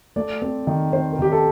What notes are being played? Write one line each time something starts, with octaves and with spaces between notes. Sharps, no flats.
A3 D5
C4
D#3
C4 C5
A#4
D#3 G4
A4